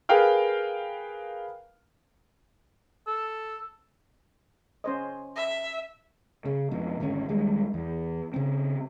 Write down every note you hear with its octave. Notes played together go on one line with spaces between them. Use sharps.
G#4 A#4 B4 F5 G5 F6
A4
C#4 C5 D#5
E5
C#3
F2 B2
G#1 D2 D3 C#4
D#2 G3 G#3
E2
C#3 C4